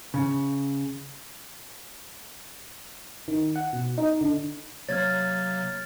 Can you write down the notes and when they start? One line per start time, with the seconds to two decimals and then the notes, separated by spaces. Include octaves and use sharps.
0.14 C#3
3.28 D#3
3.56 F#5
3.73 B2
3.98 D#4
4.21 D3
4.89 C3 F#3 A#3 C#5 F6 G#6 A6